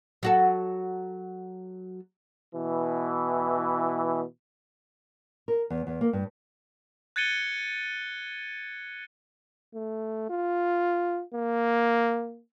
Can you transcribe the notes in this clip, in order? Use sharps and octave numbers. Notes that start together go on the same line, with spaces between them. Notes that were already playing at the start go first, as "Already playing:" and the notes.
F#3 F#4 A4
B2 E3
A#4
E2
E2
A#3
G2
F#6 G#6 A6 C#7 D#7 G7
A3
F4
A#3